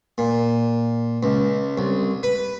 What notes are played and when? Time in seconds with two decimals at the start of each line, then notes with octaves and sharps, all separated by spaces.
0.18 A#2
1.23 C#2
1.78 C2
2.23 B4